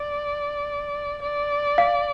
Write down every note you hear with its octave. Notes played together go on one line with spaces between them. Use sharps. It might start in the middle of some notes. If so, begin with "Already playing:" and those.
Already playing: D5
D5
F5